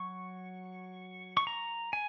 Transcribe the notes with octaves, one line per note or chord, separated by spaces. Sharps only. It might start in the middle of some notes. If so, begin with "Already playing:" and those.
Already playing: F#3 C#6
C#6
A#5
G#5